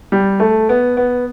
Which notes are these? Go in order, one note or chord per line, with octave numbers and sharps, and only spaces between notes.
G3
A3
B3
B3